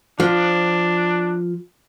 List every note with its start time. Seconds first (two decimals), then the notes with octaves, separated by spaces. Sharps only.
0.20 F3 D4